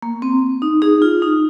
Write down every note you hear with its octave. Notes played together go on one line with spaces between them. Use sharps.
A#3
C4
D#4
D#4 G#4
F4
D#4